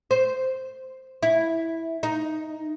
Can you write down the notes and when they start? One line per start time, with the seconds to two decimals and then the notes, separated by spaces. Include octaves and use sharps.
0.11 C5
1.23 E4
2.03 D#4